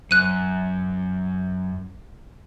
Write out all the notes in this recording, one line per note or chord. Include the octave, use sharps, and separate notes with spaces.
F#2 F#6 D#7